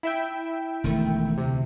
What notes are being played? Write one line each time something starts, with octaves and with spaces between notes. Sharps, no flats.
E4 E5 G5
E1 D#3 A3
D2 C3